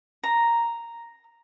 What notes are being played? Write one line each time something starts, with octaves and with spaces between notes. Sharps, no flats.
A#5